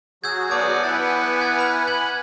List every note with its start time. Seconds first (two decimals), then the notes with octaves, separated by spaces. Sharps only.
0.24 F#3 F#4 G#4 E6 G6 G#6
0.51 B3 D5 A5 D6 G6
0.84 B3 E4 B4 F#5 G#5 A6
1.39 F#6 G#6 A6
1.59 B5 F6
1.87 G#6 F#7